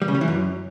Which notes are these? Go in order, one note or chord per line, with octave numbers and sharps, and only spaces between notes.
G3
C#3
G3
E3
F#2